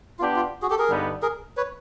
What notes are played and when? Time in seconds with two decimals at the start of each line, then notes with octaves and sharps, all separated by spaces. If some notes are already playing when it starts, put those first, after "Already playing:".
0.19 B3 D4 F4 G4
0.36 F4
0.62 F#4 G#4
0.70 G4 A4
0.79 G#4 A#4
0.88 G2 D3 G3 B3 D#4
1.22 G#4 A#4
1.57 B4 C#5